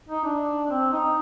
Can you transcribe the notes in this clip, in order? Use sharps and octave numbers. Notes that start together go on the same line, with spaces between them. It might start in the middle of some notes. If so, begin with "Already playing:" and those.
D#4
D4
C4
D#4